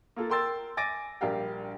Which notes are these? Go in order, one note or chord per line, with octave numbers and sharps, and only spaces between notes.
A#3 F4 A4
A#4 G5 C6 E6 A6
G#5 D6 A6 A#6 D7
A#1 G3 A#4 F5 G5